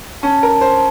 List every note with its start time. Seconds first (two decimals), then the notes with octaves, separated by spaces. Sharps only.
0.23 C#4 A5
0.43 A#4
0.61 C5